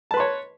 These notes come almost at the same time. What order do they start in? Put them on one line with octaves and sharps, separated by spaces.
A5 B4 C6 C#5